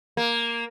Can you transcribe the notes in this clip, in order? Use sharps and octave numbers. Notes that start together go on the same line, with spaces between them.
A#3